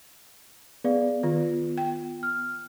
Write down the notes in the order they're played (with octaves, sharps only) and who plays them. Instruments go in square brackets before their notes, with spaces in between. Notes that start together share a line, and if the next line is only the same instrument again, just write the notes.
[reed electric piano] B3 [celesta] G#4 D5 F5
[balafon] D#3 [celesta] F4
[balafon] G5
[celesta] F6